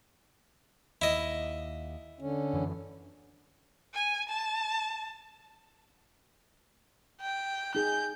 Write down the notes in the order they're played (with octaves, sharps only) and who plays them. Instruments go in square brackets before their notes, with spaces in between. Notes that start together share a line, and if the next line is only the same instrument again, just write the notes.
[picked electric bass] D#2 [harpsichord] E4 D#5
[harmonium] D3 C#4
[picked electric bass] F#2 E3
[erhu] G#5
A5
G5
[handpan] D#4 G#4 [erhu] G6